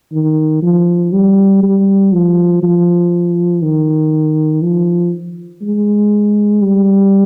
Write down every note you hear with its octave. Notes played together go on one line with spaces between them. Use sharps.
D#3
F3
G3
G3
F3
F3
D#3
F3
G#3
G3